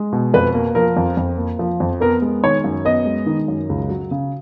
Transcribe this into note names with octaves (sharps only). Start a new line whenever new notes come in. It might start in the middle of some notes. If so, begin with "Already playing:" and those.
Already playing: G#3
B2
F2 B4
A#3
F3 A#4
F2
F2
A#3
F3
F2
B3 A#4
G#3
D#3 C#5
F#2
B3 D#5
G#3
D#3
F#2
C#2
F#3
C#3